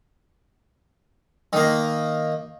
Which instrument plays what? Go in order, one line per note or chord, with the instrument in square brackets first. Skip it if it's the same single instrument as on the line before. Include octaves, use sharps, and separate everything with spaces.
[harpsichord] D#3 A#3